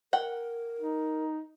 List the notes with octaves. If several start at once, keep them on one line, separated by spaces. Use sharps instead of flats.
A#4 F#5 G5
D#4